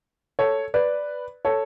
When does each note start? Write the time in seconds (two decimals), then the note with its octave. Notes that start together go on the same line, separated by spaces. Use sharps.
0.39 A4 C#5
0.74 B4 D5
1.45 A4 C#5